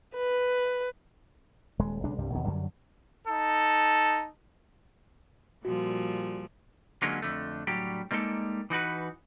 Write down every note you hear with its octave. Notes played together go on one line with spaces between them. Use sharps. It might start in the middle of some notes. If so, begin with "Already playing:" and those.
B4
D#1 G#3
B1 C#3 G#3 D4
C2 G2 C3 G3
D#2 B2 D#3
F#2 D3 F#3 G3
D#4 A4
A#2 F3 G3 F#4
D3 F#3 G#3 A#3 C#4 F4
F2 D3 A3
A2 D3 F#3 G3 G4
G3 G#3 A#3 D#4 A4
E3 D#4 F#4 B4